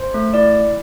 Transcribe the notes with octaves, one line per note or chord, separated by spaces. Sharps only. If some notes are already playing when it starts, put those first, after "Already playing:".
Already playing: C5
A3
E4 D5